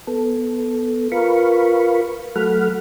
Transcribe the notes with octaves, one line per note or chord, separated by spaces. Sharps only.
B3 A4
F4 A#4 B4 F5 B5 C#6
F#3 A3 A4 F#5 B5 F6